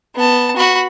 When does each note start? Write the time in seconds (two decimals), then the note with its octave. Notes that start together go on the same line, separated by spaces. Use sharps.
0.15 B3 A5
0.56 F#4 B5